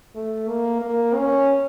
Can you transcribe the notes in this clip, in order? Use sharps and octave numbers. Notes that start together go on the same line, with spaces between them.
A3
A#3
A#3
C#4